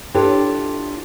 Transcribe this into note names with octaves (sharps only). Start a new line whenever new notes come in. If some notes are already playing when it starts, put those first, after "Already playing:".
D4 E4 F4 G4 A4 C#5